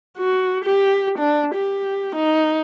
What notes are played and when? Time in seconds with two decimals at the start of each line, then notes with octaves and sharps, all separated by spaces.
0.18 F#4
0.65 G4
1.19 D4
1.55 G4
2.16 D#4